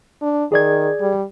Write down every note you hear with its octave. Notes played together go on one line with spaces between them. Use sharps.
D4
D#3 G#4 D5 G#6
G3